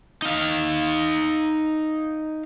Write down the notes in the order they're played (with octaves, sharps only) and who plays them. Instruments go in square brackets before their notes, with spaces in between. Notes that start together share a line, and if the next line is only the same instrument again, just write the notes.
[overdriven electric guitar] D#4 F5